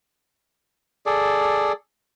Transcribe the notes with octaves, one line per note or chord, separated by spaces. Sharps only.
G#4 A4 D5